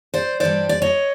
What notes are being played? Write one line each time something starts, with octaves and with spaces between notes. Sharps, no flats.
C5 D5
G2 E3 G3 C5 D5
D5
C#5 D#5